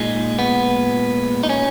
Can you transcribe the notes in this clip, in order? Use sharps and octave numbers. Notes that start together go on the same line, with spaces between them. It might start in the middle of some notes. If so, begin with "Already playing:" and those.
Already playing: A#2 G#3 D#4
B3
D#4
C#4